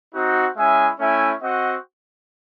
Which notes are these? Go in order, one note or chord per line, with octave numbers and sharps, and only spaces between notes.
C4 D#4 F#4
G#3 C#4 E4 E5 G#5
A3 C#4 E4 E5 G#5
C4 F#4 D#5 F#5